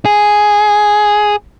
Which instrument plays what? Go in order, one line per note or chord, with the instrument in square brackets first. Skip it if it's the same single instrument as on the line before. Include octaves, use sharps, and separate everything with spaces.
[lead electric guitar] G#4